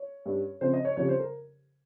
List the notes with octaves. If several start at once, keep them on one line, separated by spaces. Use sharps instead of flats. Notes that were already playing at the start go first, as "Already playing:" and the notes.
Already playing: C#5
G2 G3 C#4
C#3 F3 C4 C5
D#5
C#5
F2 C#3 G3 C#5
C5
A#4